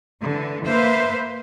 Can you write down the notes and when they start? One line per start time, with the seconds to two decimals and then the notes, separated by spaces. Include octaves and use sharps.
0.23 D3 E3
0.67 A#3 B4 C5 E5 F5